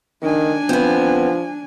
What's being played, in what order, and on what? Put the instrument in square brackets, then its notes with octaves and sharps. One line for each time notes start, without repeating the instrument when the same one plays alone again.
[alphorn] D#3 [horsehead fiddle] D4 G#5
[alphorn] F3 [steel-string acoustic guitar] B3 C4